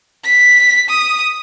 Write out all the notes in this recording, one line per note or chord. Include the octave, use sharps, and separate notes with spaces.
B6
D#6